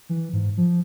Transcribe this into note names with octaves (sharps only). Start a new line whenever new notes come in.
E3
G#2
F3